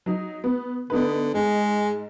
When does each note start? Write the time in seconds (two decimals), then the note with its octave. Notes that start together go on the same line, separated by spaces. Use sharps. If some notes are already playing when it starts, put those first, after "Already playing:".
0.06 F#3 D#4
0.44 B3
0.90 D3 B3 D#4 B4
1.34 G#2 G#3